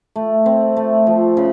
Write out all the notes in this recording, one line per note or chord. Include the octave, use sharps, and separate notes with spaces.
A3
C4
A3
F3
C#3